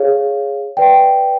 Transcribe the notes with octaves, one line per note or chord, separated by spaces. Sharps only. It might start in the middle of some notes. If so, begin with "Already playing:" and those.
Already playing: G#4 C#5 F5
B4 D5 G5